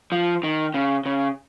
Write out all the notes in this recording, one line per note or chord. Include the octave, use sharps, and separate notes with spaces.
F3
D#3
C#3
C#3